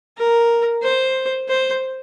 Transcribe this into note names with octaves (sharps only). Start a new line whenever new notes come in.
A#4
C5
C5